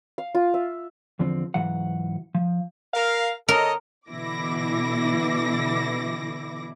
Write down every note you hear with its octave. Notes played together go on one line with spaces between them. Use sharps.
F5
F4
E5
E2 D3 F3 C4
C#2 G#2 E3 F#3 F#5
F3
A#4 F5
A4 A#4 C#5 D#5
B2 D3 E3 E4 D6 A#6